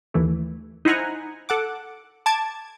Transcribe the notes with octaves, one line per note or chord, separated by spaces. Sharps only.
D#2 E3 A3
D#4 E4 C5 F#5 G#5 A#5
A4 F#5 D6
A5 D6 G#6 A6